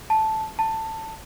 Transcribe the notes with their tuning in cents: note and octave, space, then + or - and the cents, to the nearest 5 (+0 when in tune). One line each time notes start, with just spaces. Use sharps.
A5 -5
A5 +15